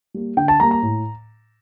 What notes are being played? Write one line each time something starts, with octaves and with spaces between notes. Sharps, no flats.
G3 A#3
D3 G5
A5
G3 A#3 A#5
A#5
A2